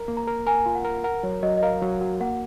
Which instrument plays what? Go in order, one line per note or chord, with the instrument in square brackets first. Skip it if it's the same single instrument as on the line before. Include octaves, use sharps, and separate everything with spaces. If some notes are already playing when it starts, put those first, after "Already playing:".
Already playing: [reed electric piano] A#4
A#3
[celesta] A#5
[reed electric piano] A#4
[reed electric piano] A#4 [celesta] G#5
[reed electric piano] F4
[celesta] F#5
[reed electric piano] A#4
[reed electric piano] A#4 [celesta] F#5
[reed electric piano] F#3 [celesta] C#5
[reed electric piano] F#3 [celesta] D#5
[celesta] D#5
[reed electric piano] A#4 [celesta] F5
[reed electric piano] F#3
F#4
[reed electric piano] A#3 [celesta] F#5